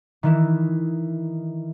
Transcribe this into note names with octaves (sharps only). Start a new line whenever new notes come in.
D#3 E3 E4